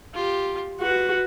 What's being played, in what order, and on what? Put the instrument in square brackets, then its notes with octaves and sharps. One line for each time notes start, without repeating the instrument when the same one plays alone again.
[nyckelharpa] F4 G4
[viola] F#4 [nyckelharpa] B4